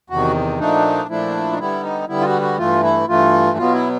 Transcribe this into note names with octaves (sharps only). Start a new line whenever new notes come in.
E2 C3 D#3 F#4
A#2 F3 A3 D4 D#4
A#2 F3 A3 D4 E4
D#4
D3 G3 B3 E4
D#4
D3 G3 B3 E4
F4
F#4
F#4
G2 E3 A3 F4
E4
G2 E3 A3 F4
B2 F#3 B3 F4
E4